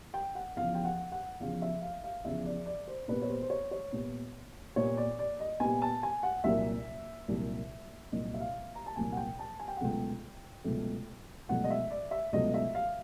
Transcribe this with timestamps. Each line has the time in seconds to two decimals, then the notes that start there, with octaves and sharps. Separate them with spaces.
0.14 G5
0.35 F#5
0.56 E2 C#3 F3 F5
0.75 G5
0.85 F#5
1.12 F#5
1.40 E2 C#3 F3 F5
1.62 E5
1.82 F5
2.04 F5
2.24 E2 C#3 F3 E5
2.45 D5
2.66 D5
2.88 C5
3.08 A#2 G3 B3 B4
3.22 C#5
3.30 C5
3.42 C5
3.50 C#5
3.71 C#5
3.92 A#2 G3 B3
4.76 A#2 G3 B3 C#5
4.97 D5
5.19 D5
5.40 D#5
5.60 A#2 G3 B3 G#5
5.82 A5
6.03 G#5
6.23 F#5
6.44 C2 A#2 F#3 A#3 E5
7.28 C2 A#2 F#3 A#3
8.12 C2 A#2 F#3 A#3 D#5
8.34 E5
8.40 F5
8.75 A#5
8.86 A5
8.96 C2 A#2 F#3 A#3 G#5
9.12 F#5
9.17 G5
9.39 A5
9.59 G#5
9.68 G5
9.77 F#5
9.81 C#2 B2 F#3 A3 G5
10.64 C#2 B2 F#3 A3
11.49 C#2 B2 F#3 A3 F#5
11.64 D#5
11.70 E5
11.91 D5
12.11 E5
12.32 C#2 B2 F#3 A3 D#5
12.54 E5
12.75 F5